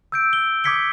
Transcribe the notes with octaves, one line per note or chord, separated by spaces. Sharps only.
E6 G6 D7
G7
D6 D#6 G#6 B6 C#7 G7